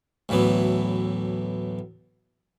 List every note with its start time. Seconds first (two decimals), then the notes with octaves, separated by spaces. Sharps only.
0.29 D2 A2 E3 F#3 B3